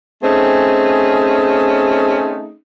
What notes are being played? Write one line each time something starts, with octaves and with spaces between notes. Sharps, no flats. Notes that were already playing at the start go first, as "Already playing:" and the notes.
A3 C4 C#4 D#4 G#4